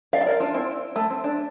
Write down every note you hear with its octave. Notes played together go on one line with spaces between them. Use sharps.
D5 F5
E5
A#4 D5
D4 F4
C4 E4
A3
C4
D4